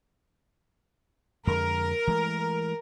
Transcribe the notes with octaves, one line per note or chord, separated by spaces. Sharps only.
F2 D3 G#3 A#4
E3 G#3 A3